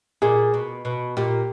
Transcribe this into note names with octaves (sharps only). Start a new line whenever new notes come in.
A#2 G#4
B2
B2
A#2 G4